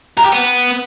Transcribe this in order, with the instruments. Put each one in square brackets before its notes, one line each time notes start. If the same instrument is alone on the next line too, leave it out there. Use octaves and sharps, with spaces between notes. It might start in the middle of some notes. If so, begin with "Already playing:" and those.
[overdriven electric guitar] A#4
G4
B3